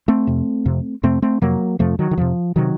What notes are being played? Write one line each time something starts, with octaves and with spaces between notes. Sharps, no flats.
A3 C4
F2 C3
F2 C3
F2 C3 A3 C4
A3 C4
F2 C3 F#3 A#3
F2 C3 F3 A3
D#3 F#3
D#3
F2 C3 F3
C3 D#3 F#3